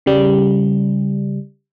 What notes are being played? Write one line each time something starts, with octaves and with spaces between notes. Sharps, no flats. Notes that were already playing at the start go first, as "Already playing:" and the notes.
C#3 G3